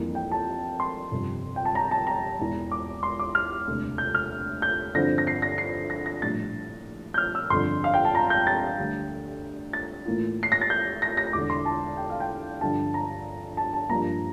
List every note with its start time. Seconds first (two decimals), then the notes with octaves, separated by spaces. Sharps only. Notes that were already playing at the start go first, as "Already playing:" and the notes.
Already playing: F2 E3 G3 A#3 D4
0.15 G5
0.32 A5
0.80 C6
1.11 G1 F2 C3
1.56 G5
1.65 A5
1.75 A#5
1.91 A5
2.07 A#5
2.39 E1 E2 E3
2.72 D6
3.03 C6
3.19 D6
3.35 F6
3.67 E1 D2 C3
3.98 G6
4.15 F6
4.62 G6
4.95 G2 D3 F3 C4 E4 A#6
5.18 A#6
5.27 C7
5.42 A#6
5.58 C7
5.90 A#6
6.06 A#6
6.22 A#1 A2 G3 D4 A6
7.14 G6
7.18 F6
7.35 E6
7.50 G1 F2 D3 C6
7.84 F5
7.94 G5
8.05 A5
8.15 A#5
8.30 G6
8.47 A6
8.78 D2 D3 G3
9.73 A6
10.05 A2 E3 A#3 F4
10.43 C7
10.52 A#6
10.61 A6
10.70 G6
11.02 A#6
11.17 A#6
11.33 E1 E2 D3 D6
11.50 C6
11.65 A5
11.97 G5
12.10 F5
12.20 G5
12.61 G2 D3 F3 A5
12.94 A#5
13.57 A5
13.74 A5
13.89 G2 F3 A#3 A#5